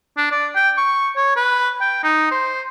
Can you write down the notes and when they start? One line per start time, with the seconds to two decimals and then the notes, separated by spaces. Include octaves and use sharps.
0.17 D4
0.32 D5
0.55 G5
0.78 C#6
1.16 C#5
1.36 B4
1.81 G5
2.03 D#4
2.31 C5